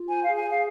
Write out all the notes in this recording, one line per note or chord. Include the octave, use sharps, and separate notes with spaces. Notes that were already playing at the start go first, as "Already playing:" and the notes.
Already playing: F4
C5 G#5
G#4 F5
G#5
G#4 F5